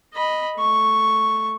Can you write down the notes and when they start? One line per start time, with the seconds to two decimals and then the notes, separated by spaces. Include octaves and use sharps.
0.14 D#5 B5
0.59 A3 C#6